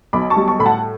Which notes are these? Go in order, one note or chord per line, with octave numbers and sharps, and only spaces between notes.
B1 B5 D6
A5 C#6
G3
A5 C#6
A2 B5
F#5 A5